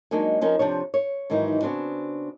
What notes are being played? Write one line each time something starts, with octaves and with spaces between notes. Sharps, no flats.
F#3 G#3 A#3 D4 D#4
F3 C#4 D#4 A#4
C3 F3 D4 C#5
C#5
G#2 D#3 E3 F#3 D#4
C#3 B3 C4 D4 F#4